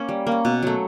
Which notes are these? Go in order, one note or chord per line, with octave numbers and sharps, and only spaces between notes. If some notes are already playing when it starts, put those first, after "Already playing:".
Already playing: A#3 C#4
G3
A#3
C#4
B2
F#3 A3